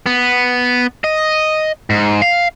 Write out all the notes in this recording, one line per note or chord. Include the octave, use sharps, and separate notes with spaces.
B3
D#5
G#2
F5